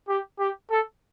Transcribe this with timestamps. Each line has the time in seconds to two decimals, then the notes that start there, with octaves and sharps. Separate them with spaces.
0.08 G4
0.39 G4
0.70 A4